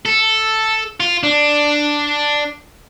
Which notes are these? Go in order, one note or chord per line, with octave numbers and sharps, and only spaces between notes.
A4
F4
D4